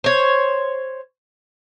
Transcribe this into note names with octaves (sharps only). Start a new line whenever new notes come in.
C5 C#5